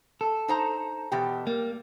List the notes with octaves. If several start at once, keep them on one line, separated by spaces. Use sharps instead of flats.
A4
D#4 C5 A#5
E2 B2 G4
G3 A#3